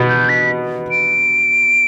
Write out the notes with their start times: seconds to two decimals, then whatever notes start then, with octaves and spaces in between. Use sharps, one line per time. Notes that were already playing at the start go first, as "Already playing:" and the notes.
Already playing: B2 B3
0.09 G6
0.29 B6
0.91 D7